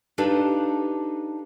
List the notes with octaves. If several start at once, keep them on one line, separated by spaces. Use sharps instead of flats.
D4 D#4 G4 A4 B4 F5